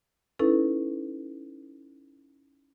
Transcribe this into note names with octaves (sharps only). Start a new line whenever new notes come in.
C#4 D#4 E4 A4 B4